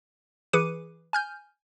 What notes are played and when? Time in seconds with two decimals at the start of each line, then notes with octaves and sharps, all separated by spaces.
0.53 E3 G#4 B4 D6 C#7 D#7
1.13 G#5 F6 G6